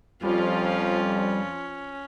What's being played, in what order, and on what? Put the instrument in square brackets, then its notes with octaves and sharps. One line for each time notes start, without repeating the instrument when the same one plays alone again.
[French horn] F2 [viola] F3 F4 [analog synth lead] G3 [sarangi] C#4